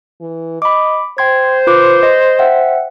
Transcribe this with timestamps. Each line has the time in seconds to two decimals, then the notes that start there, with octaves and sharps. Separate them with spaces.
0.21 E3
0.62 D#5 B5 D6
1.18 C5 G5 C6 G#6
1.67 F4 B4 D6
2.03 D#5
2.39 E5 F#5 G5